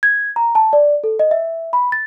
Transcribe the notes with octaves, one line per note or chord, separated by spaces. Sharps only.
G#6
A#5
A5
D5
A4
D#5
E5
B5
A6